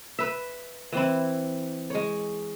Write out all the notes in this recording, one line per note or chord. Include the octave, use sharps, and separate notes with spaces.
B4 E5
E3 C4 E4
G#3 C#5